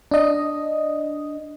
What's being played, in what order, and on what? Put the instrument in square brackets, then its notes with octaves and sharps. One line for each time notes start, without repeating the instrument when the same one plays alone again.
[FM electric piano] D4 D#5